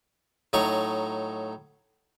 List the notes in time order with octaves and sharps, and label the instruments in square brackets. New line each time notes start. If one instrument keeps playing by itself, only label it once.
[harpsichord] A2 F#3 D#4 C#6